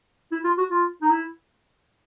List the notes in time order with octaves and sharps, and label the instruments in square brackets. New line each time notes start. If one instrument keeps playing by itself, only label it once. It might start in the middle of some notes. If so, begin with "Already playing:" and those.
[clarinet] E4
F4
F#4
F4
D#4
E4